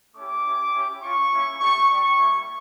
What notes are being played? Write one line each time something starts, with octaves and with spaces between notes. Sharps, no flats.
A3 C#4 E4 G4 D6
C#4 E4 G4
C#4 E4 G4
C#4 F4 C#6
A#3 C#4 E4
A3 D4 G4 C#6
G3 D4 G4 C#6
G3 A#3 E4 G4